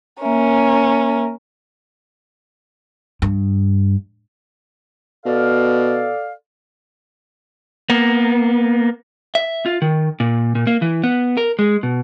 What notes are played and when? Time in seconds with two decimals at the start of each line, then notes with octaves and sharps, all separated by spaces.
0.22 A#3 C#4 A#4 E5
3.22 G2
5.25 B2 A4 D5 F5
7.90 A#3 B3
9.35 E5
9.66 F4
9.82 D#3
10.20 A#2
10.55 A#2
10.67 A#3
10.82 E3
11.04 B3
11.37 A#4
11.59 G#3
11.83 B2